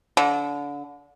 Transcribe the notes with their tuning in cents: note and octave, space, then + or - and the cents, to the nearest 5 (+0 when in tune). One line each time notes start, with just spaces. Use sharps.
D3 -30